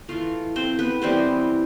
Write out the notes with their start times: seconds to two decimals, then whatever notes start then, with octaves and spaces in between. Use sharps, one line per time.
0.08 E3 A3 F4 F5
0.56 C4 C5
0.79 B3 B4
1.02 E3 G3 B3 C4 C5